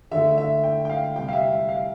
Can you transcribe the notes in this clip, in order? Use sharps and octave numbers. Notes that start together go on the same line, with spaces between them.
D3 A3 E5
E5
G5
G5
F5
C3 G3 G5
F5
E5
F5